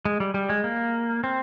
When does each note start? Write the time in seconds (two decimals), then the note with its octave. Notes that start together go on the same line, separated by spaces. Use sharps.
0.05 G#3
0.20 G3
0.34 G3
0.49 G#3
0.64 A#3
1.24 C4